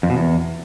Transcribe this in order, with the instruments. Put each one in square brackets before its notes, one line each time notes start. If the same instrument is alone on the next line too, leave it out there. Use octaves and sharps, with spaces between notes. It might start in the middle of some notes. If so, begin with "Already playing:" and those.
[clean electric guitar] F2
B2
E2